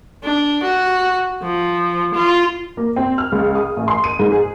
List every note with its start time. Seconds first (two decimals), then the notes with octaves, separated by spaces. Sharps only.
0.23 D4
0.63 F#4
1.42 F3
2.14 F4
2.77 A#3
2.96 C4
3.18 F6
3.32 C#2
3.55 D#6
3.77 A1
3.88 C6
4.04 D#7
4.19 G#2
4.32 G#4